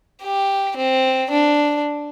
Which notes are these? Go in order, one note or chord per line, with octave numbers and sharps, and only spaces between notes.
G4
C4
D4